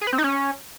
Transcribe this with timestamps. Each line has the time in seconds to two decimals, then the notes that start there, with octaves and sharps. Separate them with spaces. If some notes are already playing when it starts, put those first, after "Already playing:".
0.01 G#4
0.07 B4
0.13 C4
0.18 D#4
0.24 C#4